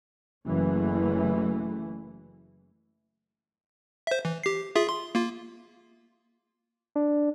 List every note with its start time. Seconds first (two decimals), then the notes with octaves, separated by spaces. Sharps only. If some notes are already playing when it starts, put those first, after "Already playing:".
0.47 F#1 E3 A3
4.07 C5 E5
4.25 E3
4.44 G4 C7
4.76 F4 G#4 E5
4.89 C6
5.15 A#3 F4
6.95 D4